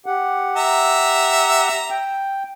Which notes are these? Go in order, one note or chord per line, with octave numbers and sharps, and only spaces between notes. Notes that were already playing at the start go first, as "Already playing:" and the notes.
G4 F#5
E5 A#5
G5